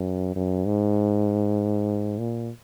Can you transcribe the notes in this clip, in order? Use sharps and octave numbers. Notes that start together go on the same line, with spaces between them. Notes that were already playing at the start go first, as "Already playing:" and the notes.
Already playing: F#2
F#2
G#2
A#2